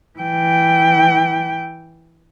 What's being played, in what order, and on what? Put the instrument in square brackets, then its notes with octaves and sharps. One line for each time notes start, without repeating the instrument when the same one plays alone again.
[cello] E3 G5